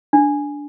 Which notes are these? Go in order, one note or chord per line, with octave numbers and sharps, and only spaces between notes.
D4